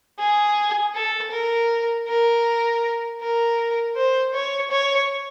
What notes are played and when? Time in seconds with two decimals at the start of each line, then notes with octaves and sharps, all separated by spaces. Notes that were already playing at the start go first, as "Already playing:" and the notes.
0.19 G#4
0.95 A4
1.32 A#4
2.08 A#4
3.21 A#4
3.96 C5
4.34 C#5
4.71 C#5